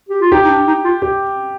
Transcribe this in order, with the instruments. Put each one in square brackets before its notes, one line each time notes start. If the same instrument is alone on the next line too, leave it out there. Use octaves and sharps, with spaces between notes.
[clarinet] G4
F4
[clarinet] D#4 [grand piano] G4
[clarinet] D#4
D4
D#4
F4
[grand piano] G4